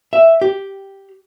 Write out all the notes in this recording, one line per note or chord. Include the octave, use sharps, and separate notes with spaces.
E5
G4